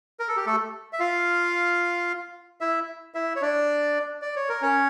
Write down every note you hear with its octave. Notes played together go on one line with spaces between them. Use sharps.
A#4
A4
G4
A3 A4
E5
F4 F5
E4 E5
E4 E5
C#5
D4 D5
D5
C#5
A#4
C#4 C#5